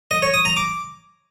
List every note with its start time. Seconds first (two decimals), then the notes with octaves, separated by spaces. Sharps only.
0.11 D#5
0.22 C#5
0.34 D#6
0.45 A#5
0.57 D6